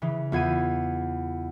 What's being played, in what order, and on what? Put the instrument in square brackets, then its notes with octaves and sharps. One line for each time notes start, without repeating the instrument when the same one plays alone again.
[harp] C#3 E3
[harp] E2 G#6 D#7 [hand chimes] B3 F4 F#5